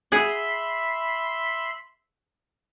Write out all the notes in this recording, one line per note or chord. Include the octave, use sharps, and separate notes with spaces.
G#4 E5 F#5 B5 C6